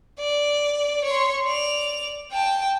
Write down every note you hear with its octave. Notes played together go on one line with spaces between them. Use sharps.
D5
C#5 C6
D5 F7
G5 A5